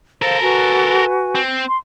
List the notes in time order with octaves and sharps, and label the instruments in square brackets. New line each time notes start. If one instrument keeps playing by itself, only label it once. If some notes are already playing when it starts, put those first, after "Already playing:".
[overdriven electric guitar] A4 A#4 [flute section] C5 F5
[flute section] F#4 B4 G#5
[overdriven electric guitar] C4
[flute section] C6